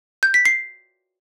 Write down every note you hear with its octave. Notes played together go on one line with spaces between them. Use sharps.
G6
B6
C7